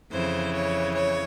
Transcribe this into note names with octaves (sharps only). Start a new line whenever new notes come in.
F2 C#3 E3 C5
C#5
C#5